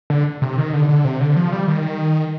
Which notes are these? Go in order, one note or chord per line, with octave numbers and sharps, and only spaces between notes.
D3
C3
D#3
D3
D3
C3
D3
F3
G3
D#3